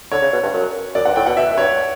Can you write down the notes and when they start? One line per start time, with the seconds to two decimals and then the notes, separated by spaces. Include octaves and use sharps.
0.12 D3 C#5
0.22 C#3
0.33 B2
0.43 G2
0.54 F#2
0.95 F#2 D5
1.05 G2 F#5
1.16 A2 G5
1.26 B2 F#5
1.37 B2 E5
1.52 F#2
1.57 G2 C#5